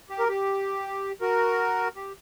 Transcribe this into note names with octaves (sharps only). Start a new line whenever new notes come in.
G4
A#4
G4
F#4 A#4
G4